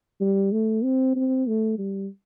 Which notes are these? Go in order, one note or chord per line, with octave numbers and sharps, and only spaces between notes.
G3
A3
C4
C4
A3
G3